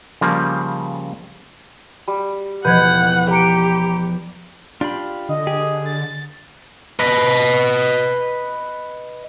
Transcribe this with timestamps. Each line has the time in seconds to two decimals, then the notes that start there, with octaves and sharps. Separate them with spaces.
0.21 C#3 F3 G3 A#3
2.08 G3
2.65 E1 F3 B3 B4 F#5 G6 G#6
3.31 G4 A#5 C#7 D7
4.81 D4 F4 G4 B5
5.29 D3 D#5
5.47 G4 G#4
5.85 A6
6.99 B4 D#5